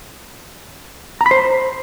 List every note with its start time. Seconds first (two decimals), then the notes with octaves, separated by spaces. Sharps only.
1.21 A#5
1.26 B5
1.31 C5